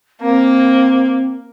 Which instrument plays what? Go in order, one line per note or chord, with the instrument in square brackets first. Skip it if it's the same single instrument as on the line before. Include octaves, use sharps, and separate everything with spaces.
[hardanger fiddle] A#3 [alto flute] C4